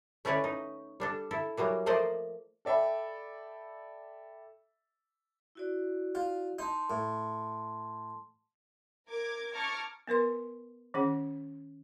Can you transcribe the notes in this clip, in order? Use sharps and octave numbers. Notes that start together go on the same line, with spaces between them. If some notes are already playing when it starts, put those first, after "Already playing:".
A3 C#4 E4 B4 C#5 D5
D#4
G3 D4 A4
E4 A4
E3 F#3 G3 A#3
F3 A3 A#3 C5 D5 D#5
A4 D5 E5 G5 B5
E4 F#4 D5
F4
D#4 A5 C6
A2
A#4 D6 G#6
A5 A#5 C#6 D6 F6 G#6
B3 A#4 B4 C6
D#3 C#4 G#4 F#5